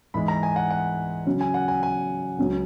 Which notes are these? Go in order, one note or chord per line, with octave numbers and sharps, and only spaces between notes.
G#2 E3 G#3 B5
A#5
G#5
F#5
F#5
C#3 F#3 C#4
G#5
F#5
G#5
G#5
C#2 C#3 F#3 C#4